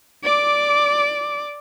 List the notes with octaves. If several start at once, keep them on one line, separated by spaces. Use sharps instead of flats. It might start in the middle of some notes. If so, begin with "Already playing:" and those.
D5 D6